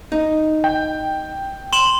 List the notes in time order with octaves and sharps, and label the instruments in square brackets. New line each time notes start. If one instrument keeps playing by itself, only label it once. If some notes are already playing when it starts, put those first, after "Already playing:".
[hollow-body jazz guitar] D#4
[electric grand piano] G5
[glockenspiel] C6 E7 F#7